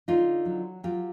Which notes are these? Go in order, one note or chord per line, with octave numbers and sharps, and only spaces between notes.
D3 D#4 F4
F#3
F#3 F4 G4